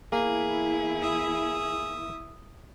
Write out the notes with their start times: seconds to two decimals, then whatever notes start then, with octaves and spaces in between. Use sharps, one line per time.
0.12 E2 A#3 E4 G#4
1.02 E5 D#6